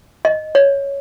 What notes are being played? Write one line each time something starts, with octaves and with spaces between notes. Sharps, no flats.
D#5
C#5